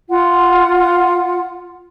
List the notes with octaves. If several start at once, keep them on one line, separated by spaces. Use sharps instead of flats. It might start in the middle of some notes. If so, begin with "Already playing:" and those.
F4 F#5